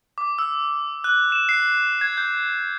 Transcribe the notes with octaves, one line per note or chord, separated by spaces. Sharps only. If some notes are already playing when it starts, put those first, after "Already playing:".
D6
E6
F#6
E7
C7
G#6
G6